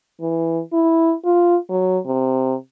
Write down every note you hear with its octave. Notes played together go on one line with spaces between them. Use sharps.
E3
E4
F4
F#3
C3